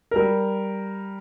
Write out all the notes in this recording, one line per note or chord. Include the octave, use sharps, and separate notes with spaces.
G3 A#4